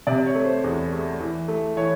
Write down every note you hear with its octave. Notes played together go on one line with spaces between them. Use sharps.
C3 D5
C#5
A3
C5
E2
A3
E3
A3
E3 C#5